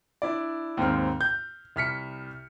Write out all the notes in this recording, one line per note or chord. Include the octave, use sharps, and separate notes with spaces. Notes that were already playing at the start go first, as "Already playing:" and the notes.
D4 E4 D5
D#2 G#2 C4 F6
G6
C2 F6 B6 C#7